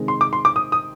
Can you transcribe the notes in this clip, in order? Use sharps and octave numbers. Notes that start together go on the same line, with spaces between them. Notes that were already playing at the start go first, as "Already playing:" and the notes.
Already playing: C3 D#3 G#3 C4
C6
D6
C6
D6
D#6
D#6